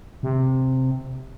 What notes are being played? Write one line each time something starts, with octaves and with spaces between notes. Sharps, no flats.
C3